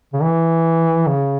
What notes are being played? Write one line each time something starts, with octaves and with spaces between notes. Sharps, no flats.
C#3
E3
C#3